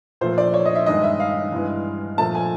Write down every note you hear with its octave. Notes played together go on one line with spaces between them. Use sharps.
A#2 F3 A3 C5
D5
C#5
D#5
E5
G2 D#3 G#3 D#5
E5
F5
G2 E3 G#3
A#2 F3 A3 A5
G#5